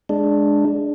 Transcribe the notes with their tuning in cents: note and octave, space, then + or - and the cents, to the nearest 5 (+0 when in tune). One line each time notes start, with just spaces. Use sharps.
G#3 +5 D4 +0